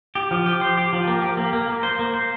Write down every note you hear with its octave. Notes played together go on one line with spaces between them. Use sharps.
G4
F3
G4
C5
G4
F3
A#3
G4
A#3
A#3
A#3
C5
A#3
C5